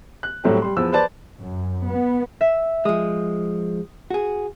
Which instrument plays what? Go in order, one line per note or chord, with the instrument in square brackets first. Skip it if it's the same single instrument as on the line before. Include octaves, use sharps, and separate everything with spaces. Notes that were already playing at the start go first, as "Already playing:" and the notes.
[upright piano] F#6
A2 F#3 G3 A3 C4 G4
G3 C6
E2 F3 B3 E6
B4 C5 D5 A5 A6
[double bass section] F#2
B3
[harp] E5
[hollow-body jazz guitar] F3 G#3 [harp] D#6
[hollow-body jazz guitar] F#4 G#4